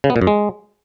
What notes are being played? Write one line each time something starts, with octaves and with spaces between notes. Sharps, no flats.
C#3
B3
A#2
F#2
G#3